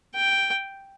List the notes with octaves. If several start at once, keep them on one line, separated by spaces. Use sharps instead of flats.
G5